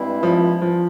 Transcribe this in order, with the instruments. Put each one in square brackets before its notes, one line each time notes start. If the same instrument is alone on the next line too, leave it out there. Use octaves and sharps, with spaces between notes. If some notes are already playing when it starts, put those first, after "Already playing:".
Already playing: [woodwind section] G2 E3 G#3 C4 E4
[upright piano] F3
F3